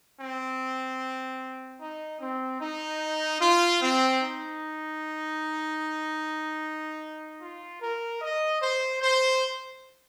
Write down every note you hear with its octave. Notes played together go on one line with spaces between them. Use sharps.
C4
D#4
C4
D#4
F4
C4
D#4
F4
A#4
D#5
C5
C5